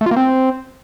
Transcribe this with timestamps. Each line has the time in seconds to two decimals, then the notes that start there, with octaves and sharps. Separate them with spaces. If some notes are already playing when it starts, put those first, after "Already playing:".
0.01 A3
0.06 F4
0.11 A#3
0.16 C4